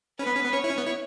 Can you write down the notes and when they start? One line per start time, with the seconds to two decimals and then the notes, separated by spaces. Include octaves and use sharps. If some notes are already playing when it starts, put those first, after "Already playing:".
0.19 C#4 B4
0.27 B3
0.36 C#4
0.45 B3
0.53 C#4 C#5
0.64 E4
0.70 C#4
0.78 B3
0.86 E4